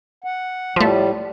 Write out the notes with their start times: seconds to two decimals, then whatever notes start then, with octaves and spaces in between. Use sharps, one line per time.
0.24 F#5
0.76 A2 F3 G3 A3